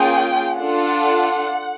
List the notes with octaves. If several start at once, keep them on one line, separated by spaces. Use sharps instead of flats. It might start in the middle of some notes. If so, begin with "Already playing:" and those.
Already playing: A#3 C#4 F4 G#4 G5
D4 F4 A4 F#5